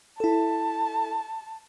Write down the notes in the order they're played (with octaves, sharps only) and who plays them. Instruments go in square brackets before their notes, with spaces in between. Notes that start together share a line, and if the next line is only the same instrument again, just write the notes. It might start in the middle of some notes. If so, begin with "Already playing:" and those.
[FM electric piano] E4 A4 [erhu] A5